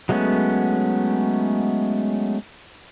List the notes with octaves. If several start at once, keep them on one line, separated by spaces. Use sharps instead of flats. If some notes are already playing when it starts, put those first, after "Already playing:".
F#3 G#3 A3 B3 C#4